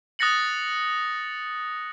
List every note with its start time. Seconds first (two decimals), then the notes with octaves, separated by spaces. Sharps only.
0.19 D#6 F#6 A6 A#6 C#7 F#7